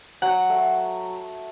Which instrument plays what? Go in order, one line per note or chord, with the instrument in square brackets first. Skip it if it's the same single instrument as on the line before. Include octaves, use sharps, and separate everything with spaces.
[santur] F#3 [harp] F#5
[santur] A3